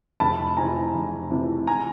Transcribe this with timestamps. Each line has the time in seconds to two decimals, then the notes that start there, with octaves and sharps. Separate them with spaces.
0.20 F1 A5 B5
0.57 F2 C3 E3 G#5 A#5
0.95 F1
1.30 F2 C3 E3
1.67 G#5 A#5